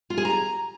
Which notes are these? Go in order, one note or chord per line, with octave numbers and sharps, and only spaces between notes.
F4
G#4
A#5